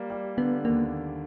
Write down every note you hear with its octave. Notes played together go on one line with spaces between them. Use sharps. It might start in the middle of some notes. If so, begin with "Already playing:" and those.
Already playing: G3 A#3
G3
D3 B3
D#2 A#3